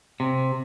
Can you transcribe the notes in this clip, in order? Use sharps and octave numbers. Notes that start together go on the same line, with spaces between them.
C3